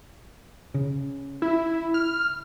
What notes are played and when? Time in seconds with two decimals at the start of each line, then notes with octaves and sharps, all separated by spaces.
0.74 C#3
1.42 E4
1.94 F6